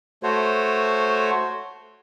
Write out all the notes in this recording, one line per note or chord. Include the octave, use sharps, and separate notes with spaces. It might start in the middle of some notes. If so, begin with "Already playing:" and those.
A3 F#4 C5 C#5